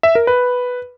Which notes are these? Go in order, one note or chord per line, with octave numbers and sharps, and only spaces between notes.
E5
A#4
B4